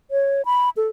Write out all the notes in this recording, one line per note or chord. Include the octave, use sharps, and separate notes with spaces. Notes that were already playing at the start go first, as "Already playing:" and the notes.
C#5
B5
A4